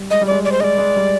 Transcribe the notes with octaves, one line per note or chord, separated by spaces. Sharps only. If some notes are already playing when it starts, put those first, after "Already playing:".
Already playing: G3
G#3 D#5
G3
G#3 D5
D5
C5
G#3 D5 D#5
G#3
G3